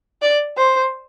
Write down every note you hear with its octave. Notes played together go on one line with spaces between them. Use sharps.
D5
C5